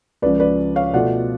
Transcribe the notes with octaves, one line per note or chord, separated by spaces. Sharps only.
C#2 C#3 F3 B4 D5
B4 D5
C#5 F5
B2 A3 F4 D5 F#5